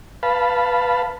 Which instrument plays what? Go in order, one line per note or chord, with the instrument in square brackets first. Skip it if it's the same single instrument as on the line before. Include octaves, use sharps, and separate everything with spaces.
[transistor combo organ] B4 F5 A5 B5